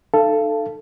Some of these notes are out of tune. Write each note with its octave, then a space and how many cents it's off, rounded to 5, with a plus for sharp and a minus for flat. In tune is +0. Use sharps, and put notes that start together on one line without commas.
D#4 -40 A4 +0 F5 -30